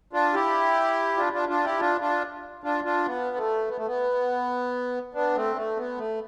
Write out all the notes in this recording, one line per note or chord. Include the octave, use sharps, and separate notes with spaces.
D4 F4
E4 G4
D4 F4
D4 F4
D4 F4
E4 G4
D4 F4
D4 F4
D4 F4
D4 F4
B3
A3
B3
A3
B3
B3 D4
A3 C4
A3
B3
A3